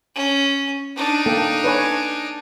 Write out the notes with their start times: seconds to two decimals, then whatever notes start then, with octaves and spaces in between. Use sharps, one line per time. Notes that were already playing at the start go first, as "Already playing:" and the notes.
0.15 C#4
0.96 D4 D#4
1.26 A#3 A4 G5
1.64 B4 C#5 G#5